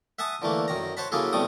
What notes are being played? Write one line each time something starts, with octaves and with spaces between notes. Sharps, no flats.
E5 F#5 G#5 A5 D#6
D3 E3 A3 A#3
F#2 D#3 A#5
C5 C#5 F#5 A5 B5
C#3 F#3 A#3 E4 G#4 A4
B1 A2 C3 G3 A3 D#6